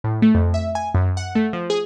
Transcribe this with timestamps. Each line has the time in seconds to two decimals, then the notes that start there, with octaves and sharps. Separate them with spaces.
0.04 A2
0.22 A3
0.35 F2
0.54 E5
0.75 G#5
0.95 F#2
1.17 F#5
1.35 A3
1.53 F3
1.70 G#4